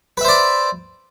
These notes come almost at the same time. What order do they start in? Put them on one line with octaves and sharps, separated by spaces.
B4 E5 C5 D5